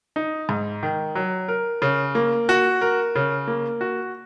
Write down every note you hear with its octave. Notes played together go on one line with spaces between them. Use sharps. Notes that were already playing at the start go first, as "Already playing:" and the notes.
D#4
G#2
D#3
F#3
A#4
C#3
A#3
F#4
A#4
C#3
A#3
F#4